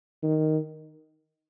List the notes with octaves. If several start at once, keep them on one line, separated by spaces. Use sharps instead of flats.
D#3